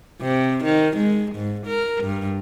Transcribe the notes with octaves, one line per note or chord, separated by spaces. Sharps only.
C3
D#3
G#3
G#2
A#4
G2